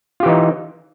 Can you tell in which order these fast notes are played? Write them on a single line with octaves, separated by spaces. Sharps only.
F4 G4 E3 D#4